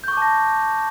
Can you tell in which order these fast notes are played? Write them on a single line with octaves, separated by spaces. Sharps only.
G6 C#6 D6 A5 A#6